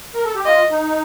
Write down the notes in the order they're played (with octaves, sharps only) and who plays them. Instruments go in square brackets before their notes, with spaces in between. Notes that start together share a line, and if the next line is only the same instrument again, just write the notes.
[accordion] A#4
A4
G4
[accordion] F4 [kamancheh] D#5
[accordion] D#4